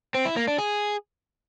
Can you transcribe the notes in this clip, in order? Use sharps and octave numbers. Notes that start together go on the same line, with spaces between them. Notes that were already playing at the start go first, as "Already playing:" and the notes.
C4
E4
A#3
D4
G#4